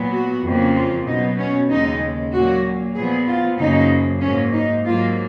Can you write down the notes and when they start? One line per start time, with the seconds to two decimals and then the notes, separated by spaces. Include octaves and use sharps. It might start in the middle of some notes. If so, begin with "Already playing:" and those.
Already playing: A#2 F#3 B3
0.12 F#4
0.43 F2 C#3 F3 A#3
0.75 F4
1.06 B2 F#3 B3 D#4
1.38 C#4
1.69 D#2 C#3 G#3 D#4
2.32 A#2 F#3 A#3 F#4
2.96 A#2 F3 B3 G#4
3.28 F4
3.59 F#2 C#3 F3 A#3 D#4
4.21 G#2 F#3 A#3 C#4
4.53 D#4
4.84 G#2 F#3 A#3 F4